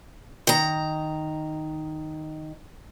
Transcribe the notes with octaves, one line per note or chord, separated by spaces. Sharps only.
D#3 A#5